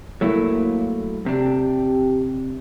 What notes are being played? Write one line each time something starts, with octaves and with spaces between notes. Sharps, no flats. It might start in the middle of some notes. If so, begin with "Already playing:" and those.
A2 F#3 A3 A#3 E4
C3 D4 G4